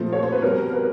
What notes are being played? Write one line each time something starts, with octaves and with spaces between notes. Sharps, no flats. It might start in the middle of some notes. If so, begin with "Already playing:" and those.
Already playing: A#2 F3 A3 C4
C#5
C5
B4
B2 G3 C4 A#4
B4